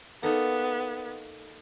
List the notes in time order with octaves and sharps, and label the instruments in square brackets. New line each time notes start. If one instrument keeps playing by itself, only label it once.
[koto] A#3 D#4 A4 [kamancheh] B3